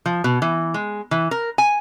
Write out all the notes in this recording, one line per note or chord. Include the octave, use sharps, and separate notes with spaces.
F3
B2
E3
G#3
E3
A#4
G#5